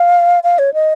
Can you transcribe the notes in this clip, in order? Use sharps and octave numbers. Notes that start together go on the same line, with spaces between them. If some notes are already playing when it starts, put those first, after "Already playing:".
Already playing: F5
F5
C#5
D#5